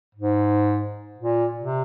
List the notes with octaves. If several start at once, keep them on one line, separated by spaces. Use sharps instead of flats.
G#2
A#2
C3